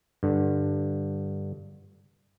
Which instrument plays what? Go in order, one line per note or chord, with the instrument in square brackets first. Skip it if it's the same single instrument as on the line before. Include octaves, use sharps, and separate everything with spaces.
[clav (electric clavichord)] G2 D3